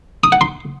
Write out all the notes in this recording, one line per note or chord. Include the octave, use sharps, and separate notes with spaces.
D#6
F#5
C6